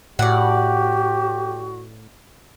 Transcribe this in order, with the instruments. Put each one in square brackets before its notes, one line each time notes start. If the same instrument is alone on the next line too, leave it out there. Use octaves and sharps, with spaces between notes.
[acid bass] A2 [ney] F#4 [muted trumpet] G4 [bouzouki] D5 F#5